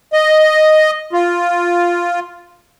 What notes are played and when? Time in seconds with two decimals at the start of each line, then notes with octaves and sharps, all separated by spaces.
0.13 D#5
1.13 F4